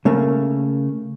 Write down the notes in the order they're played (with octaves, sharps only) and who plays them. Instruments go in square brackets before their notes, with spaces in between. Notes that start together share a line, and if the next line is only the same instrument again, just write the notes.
[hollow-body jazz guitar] C#3 A3 A#3